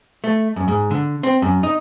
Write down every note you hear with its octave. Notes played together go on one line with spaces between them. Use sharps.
A3
F#2
G#2
D3
C4
F#2
D#4